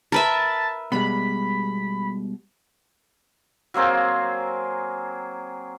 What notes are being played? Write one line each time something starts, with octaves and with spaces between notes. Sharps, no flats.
A#4 B4 E5 A5
B2 G3 G#3 B5
F#3 A#3 C4 G#4